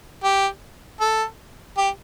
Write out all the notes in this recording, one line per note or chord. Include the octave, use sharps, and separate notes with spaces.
G4
A4
G4